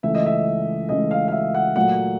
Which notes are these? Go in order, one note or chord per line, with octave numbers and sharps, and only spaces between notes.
C#2 C#3 E3 A3 E5
D#5
E5
C#2 C#3 E3 A3 D#5
F5
F5
E5
F#5
A#2 F#3 A3 F#5